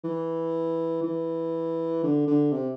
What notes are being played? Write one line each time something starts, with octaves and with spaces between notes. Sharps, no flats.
E3
E3
D3
D3
C3